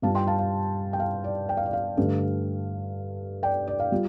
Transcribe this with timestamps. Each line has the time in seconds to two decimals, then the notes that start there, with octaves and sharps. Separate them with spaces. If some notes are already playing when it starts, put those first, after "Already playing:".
0.02 G2 G3 F4 F5 A5
0.15 G5 C6
0.27 F5 A5
0.39 F5
0.93 G5
0.99 F5
1.24 D5
1.49 G5
1.57 F5
1.66 D5
1.73 F5
1.97 G2 D3 A3
3.43 D5 G5
3.67 D5
3.80 F5
3.92 G3 F4